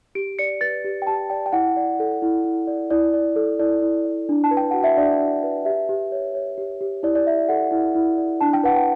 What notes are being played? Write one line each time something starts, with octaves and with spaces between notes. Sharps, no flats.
G4 D7
D5 C#7
B4 A6
G4
G5
G4 A5
D5 G5
G5
E4 F#5
D5
A4
E4
E4
D5
E4 D5
D5
A4
E4 D5
E4
D5
D4
A5
B4
G5
F#4 F#5
E5
D4 D5
D4
B4
G4 E5
G4
C#5
C#5
G4
G4
E4 D5
D5
D5 E5
A4 F#5
E4
E4
D5
D4 A5
G5
B4 F#5
G5